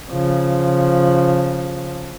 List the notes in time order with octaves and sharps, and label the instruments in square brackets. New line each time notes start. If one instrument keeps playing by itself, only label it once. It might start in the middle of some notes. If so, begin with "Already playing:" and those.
[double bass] C#3 F3